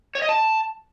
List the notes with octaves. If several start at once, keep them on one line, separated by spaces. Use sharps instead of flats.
C#5
D#5
A5